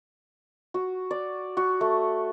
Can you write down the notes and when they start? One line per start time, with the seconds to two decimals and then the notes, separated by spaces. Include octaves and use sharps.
0.74 F#4
1.11 D5
1.57 F#4
1.81 A3